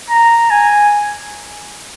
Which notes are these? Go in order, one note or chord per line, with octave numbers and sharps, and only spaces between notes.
A#5
G#5